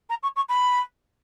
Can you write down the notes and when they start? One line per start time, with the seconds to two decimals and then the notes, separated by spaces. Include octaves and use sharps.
0.10 A#5
0.23 C#6
0.36 C#6
0.49 B5